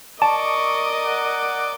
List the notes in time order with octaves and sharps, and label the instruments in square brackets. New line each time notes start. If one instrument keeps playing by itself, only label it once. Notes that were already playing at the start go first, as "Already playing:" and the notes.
[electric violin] A#4 D#5 [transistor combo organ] D5 [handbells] A5 [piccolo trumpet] C#6
[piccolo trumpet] F#5